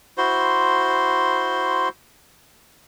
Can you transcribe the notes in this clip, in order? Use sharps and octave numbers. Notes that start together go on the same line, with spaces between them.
E4 F#4 C5 C6